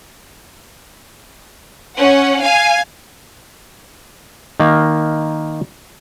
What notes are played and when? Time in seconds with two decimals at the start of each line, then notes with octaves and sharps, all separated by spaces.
1.96 C#4 F#5
2.41 F5 G#5
4.60 D#3 A#3